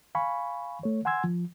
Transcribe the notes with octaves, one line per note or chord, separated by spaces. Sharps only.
F5 G#5 B5 C#6
A3 C#5
F#5 G#5 C6 E6 G#6
F3